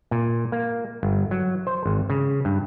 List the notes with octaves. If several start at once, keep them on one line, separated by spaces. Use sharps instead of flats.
A#2
A#3
G1
F#3
C5
G#1
C#3
G2